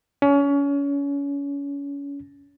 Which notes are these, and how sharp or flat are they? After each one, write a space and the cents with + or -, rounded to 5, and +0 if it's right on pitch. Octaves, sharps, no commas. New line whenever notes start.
C#4 +30